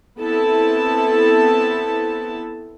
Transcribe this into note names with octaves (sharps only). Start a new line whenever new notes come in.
B3 C4 E4 A4 A5